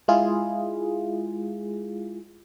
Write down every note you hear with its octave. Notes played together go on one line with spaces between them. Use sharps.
G#3 E4 F4 G#4